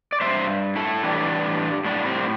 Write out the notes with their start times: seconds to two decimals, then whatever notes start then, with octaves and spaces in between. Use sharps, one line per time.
0.12 D5
0.21 G2 G3 C5 E5
0.76 E4 A4
1.03 A2 E3 G3 D4 G4
1.85 A2 G3 A3 D4
2.05 G3 C4